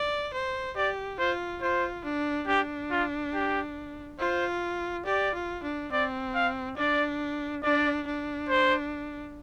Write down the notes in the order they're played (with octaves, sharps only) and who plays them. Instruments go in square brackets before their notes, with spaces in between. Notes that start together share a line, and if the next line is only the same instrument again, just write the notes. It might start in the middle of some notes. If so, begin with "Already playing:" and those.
Already playing: [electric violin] D5
C5
[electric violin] G4 [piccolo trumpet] D5
[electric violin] F4 [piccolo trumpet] C5
[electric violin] F4 [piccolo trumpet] C5
[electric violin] D4
[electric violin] D4 [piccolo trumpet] G4
[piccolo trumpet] F4
G4
[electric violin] F4 [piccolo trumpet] C5
[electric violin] G4 [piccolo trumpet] D5
[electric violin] F4
D4
[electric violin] C4 [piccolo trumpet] D5
[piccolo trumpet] F5
[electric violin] D4 [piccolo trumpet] D5
[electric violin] D4 [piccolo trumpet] D5
[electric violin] D4
[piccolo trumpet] C5